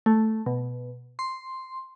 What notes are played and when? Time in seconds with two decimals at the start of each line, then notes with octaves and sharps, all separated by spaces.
0.06 A3
0.46 B2
1.19 C6